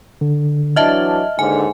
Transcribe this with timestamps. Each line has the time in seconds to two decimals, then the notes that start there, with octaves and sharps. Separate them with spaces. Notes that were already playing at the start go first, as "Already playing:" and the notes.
0.21 D3
0.76 E3 F#3 D4 D#5 E5 A5 F6
1.39 D#2 G#2 D3 G#5